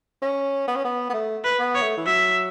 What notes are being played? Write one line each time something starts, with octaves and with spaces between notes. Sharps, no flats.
C#4
B3
C#4
B3
B3
A3
B4
B3
C#5
A3
E3
F#3 E5